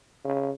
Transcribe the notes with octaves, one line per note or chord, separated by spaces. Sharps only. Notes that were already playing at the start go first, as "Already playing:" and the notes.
C#3